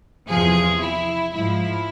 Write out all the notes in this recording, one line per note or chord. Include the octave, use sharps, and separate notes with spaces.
E2 C3 F3 G#4
E4
G#2 F3 E4